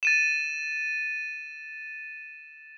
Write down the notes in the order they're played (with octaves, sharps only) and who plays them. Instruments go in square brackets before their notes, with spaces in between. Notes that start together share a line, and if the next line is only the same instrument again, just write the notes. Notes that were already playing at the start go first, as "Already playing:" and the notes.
[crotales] A6 D#7 E7